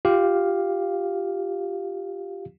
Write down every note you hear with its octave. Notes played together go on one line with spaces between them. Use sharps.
F4 G4 F5